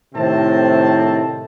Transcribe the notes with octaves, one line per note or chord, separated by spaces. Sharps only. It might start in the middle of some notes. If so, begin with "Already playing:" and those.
A2 C3 D#3 C4 A5